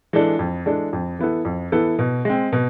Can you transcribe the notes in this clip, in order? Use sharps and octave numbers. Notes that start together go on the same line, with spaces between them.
E3 G#3 D4 A4
F2
E3 G#3 D4 A4
F2
E3 B3 E4 A4
F2
E3 B3 E4 A4
B2
G#3 C4
B2